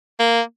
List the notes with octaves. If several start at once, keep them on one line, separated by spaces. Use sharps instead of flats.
A#3